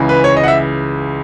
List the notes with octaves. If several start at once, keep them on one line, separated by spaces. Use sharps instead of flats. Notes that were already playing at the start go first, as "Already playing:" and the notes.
Already playing: C#2 C#3 E3
B4
C#5
D#5
F#5
E5